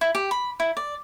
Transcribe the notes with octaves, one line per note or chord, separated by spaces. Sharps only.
E4
G4
B5
E4
D5